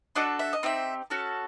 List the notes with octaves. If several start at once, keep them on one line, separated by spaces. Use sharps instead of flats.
D4 F#4 A4 D#5
E5
D#5
C4 D#4 G4 E5
C#4 F#4 A4